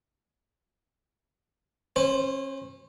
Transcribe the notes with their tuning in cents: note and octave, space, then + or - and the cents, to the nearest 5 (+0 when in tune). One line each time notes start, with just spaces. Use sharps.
C#4 -35 C5 +0